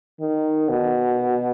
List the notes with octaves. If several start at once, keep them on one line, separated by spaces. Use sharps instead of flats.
D#3
B2